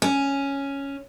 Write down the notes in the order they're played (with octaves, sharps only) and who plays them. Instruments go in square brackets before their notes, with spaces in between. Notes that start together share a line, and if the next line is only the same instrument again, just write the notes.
[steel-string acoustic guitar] C#4